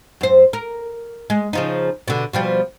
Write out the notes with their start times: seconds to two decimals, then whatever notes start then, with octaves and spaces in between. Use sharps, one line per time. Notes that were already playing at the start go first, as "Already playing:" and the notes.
0.21 F#2 C5
0.53 A#4
1.30 G#3
1.53 C#3 F3 D#4
2.08 B2 D3
2.33 B2 F3 G3